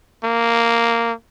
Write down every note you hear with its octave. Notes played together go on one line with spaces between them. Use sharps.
A#3